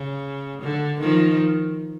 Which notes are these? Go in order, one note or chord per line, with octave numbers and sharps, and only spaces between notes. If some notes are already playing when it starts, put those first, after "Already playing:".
Already playing: C#3
D3
D#3 F3